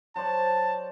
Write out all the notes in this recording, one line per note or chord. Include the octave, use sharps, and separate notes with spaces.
F#3 C5 D5 A5